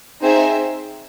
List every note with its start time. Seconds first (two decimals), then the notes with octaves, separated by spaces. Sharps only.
0.21 C4 D#4 G#4 C5 E5